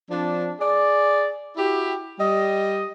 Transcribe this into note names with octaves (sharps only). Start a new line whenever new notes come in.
F3 C4 D4
G#4 D5
E4 F#4 G4
G3 D#5